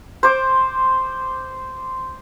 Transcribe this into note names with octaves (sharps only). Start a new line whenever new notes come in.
C5 D6